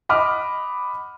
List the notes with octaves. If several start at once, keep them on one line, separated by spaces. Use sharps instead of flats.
D#5 F#5 B5 D6 F6